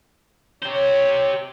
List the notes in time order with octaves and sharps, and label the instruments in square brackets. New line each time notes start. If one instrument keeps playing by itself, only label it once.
[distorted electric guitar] G4 C5 [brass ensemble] C#5